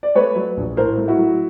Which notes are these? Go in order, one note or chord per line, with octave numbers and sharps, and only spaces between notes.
D5
A3 B4 C#5
F#3
A#1
A2 A#4 C5
A3
E4 F#4
F#3